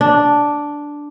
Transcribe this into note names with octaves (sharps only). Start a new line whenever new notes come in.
D4